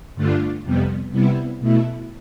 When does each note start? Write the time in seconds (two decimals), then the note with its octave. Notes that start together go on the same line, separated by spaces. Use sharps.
0.15 G2 D3 A3 D4 F4
0.64 F2 C3 G3 B3
1.11 C3 G3 B3 E4
1.60 B2 A3 E4